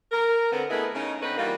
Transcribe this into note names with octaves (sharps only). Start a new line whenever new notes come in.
A#4
D3 B3 C4
A3 B3 E4 G#4 B4 D#5
C#3 D#4
D3 C4 C#4 D#4 B4
E3 G3 A#3 F4 F#4